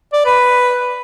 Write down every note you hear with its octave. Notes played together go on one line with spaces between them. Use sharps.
D5
B4